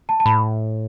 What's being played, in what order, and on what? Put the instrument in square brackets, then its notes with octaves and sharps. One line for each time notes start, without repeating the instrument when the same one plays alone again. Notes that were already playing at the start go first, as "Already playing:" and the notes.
[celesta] A5
A5
[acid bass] A2 [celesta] B5